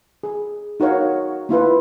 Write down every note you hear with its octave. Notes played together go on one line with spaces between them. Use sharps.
G#4
D#4 F#4 A#4 C#5 F5
A#3 E4 F4 B4